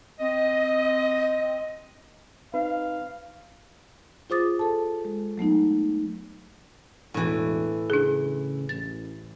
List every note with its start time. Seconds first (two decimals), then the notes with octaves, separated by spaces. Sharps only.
0.19 C4 D#5
2.54 C4 D#4 B4 F5
4.30 F4 G#4 C5 D6 D#6 A6
4.59 A4 A5
5.05 G#3
5.38 F#3 A3 B3 D#4
7.14 E1 A2 E3
7.90 C#3 D4 G#4
8.69 A1 A6